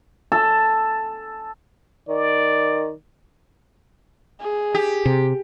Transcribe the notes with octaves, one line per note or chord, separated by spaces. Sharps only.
A4
D#3 D5
G#4
G4
C3